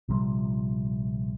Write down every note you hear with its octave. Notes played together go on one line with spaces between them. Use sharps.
A#1 C3 F3 G3